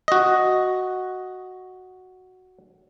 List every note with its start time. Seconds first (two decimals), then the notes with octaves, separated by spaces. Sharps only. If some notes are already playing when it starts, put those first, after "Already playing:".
0.08 F#4 D#5